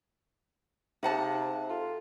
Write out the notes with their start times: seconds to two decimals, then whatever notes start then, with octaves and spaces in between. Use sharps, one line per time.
1.03 C3 D#4 G#4 C5 F5 F#5 A5
1.70 F4 A4